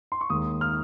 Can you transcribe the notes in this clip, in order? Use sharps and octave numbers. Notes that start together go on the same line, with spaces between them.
C6
C#6
D#2 D#3 G#3 D#6
F6